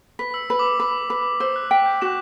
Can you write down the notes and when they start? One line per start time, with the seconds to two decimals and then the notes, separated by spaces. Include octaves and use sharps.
0.19 B4 B6
0.34 E6
0.50 B4
0.59 D6
0.64 E6
0.80 B4
1.10 B4
1.40 C5 E6
1.56 F#6
1.71 G5 B6
1.86 G6
2.01 F#4 E7